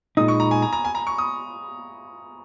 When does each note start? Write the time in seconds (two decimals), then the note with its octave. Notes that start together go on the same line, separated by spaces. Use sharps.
0.17 A#2 G#3 D#4 D#6
0.28 C#6
0.40 A#5
0.51 G#5
0.62 A#5
0.73 A#5
0.85 G#5
0.95 A#5
1.07 C#6
1.18 D#6